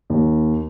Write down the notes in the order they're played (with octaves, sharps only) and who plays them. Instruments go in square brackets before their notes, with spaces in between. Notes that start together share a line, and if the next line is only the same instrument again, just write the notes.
[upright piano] D#2